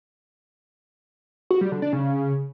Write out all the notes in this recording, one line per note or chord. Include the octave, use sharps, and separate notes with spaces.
F#4
G3
D3
D4
C#3